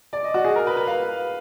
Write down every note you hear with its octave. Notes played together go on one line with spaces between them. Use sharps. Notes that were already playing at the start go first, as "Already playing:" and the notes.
D5
D#5
F#4
G#4
A#4
B4
B4
F5